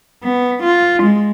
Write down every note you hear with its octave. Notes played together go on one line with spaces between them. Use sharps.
B3
F4
G#3